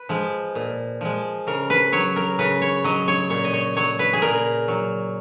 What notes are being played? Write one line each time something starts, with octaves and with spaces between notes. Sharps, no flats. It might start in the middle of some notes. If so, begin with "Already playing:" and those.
Already playing: B4
F3 G#3
A#2
F3 G#3
C#3 A#4
B4
F#3 C#5
A#4
C#3 B4
C#5
F#3 D#5
C#5
A#2 C#5
D#5
C#5
F#3 C#5
B4
G#4
A#2 A#4
F#3